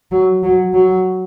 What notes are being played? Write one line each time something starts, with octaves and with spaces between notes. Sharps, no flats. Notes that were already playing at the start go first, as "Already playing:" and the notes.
F#3
F#3
F#3